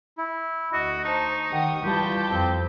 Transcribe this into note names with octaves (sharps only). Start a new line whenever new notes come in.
E4
D2 F#4 D#5
D#4 C5 A5 C#6
D#3 G4 F#5 D#6
E3 G3 F4 G4 A5 G6
F2 C4